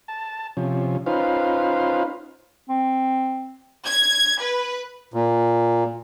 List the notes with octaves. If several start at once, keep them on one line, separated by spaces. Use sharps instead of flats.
A5
C3 F3 C#4
C#4 D#4 F4 B4 C5 F5
C4
G#6
B4
A#2